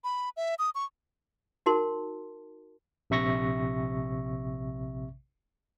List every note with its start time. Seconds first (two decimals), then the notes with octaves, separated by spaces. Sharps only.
0.04 B5
0.37 E5
0.59 D#6
0.75 C#6
1.66 D#4 F#4 A#4 A5 C6
3.10 A#1 C3 E5 C#6 A#6